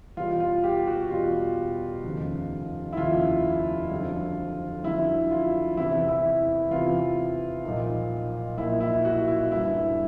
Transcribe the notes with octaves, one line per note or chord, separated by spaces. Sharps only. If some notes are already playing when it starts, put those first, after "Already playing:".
E2 B2 G3 F4
F4
G4
F#4
E2 B2 G3 F4
F1 D#2 C#3
E4
F1 D#2 C#3 F4
F2 D3 F#3
F2 D3 F#3 E4
F4
E2 C3 E3 E4
E4
E2 C3 E3 F4
B1 A#2 F3 A#3 D#4
B1 A#2 F3 A#3 D#4 E4
E4
F#4
E4
G1 G2 D3 E4